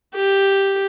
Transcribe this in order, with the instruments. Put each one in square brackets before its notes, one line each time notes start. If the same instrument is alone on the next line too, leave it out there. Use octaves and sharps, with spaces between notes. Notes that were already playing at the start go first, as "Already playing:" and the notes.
[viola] G4